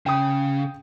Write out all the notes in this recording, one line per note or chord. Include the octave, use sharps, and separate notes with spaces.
C#3 G5 D#6